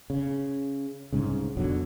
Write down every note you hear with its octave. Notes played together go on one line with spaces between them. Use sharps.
C#3
C2 G#2 C#3
F2 B2 D3 F#3